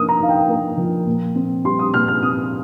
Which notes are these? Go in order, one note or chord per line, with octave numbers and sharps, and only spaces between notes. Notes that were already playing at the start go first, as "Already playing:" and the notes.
Already playing: F3 A#3 D#4 D#6 F6
A#5
D#4 F5
G5
A#3
F3
A#2
C4
G3 C6
D#6
A#2 F6
F6
C4 D#6